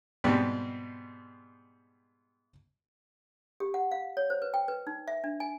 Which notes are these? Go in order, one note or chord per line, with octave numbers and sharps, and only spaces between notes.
G#2 B2 G3 B3 C4
G4
F#5
F5
C#5
C5
B4
G5
B4
D#4
E5
D4
G#5